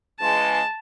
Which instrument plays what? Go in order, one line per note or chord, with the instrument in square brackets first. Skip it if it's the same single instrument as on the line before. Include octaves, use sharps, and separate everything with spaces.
[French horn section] C#3 E3 G#3 [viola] A5